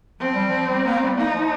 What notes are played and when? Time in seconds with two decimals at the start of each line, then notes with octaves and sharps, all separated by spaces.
0.20 F3 C4
0.34 G3
0.47 F3
0.69 G3
0.85 A#3
1.02 G3
1.18 A#3 D#4
1.34 F3